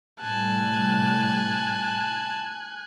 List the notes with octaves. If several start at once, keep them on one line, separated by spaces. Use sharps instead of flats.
A2 C3 G3 G#5 A5 F#6